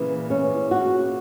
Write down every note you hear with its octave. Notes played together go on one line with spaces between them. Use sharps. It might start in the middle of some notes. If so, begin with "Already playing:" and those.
Already playing: A#2 C#3 E3
C#4
F#4